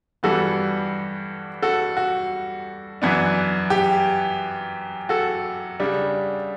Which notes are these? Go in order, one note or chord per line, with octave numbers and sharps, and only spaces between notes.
G2 E3 G3 B3 F#4 A4
F#4 A4
F#4
F#2 E3 B3 D4
G4
F#4 A4
C#3 G3 D4